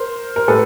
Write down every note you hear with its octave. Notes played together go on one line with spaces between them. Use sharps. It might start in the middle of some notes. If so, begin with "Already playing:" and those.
Already playing: A#4 C5
A#4
A2 A4 B4